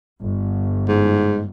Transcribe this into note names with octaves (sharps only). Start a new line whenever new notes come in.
G1
G#2